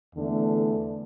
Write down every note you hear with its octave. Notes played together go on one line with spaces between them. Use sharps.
E2 D3 A3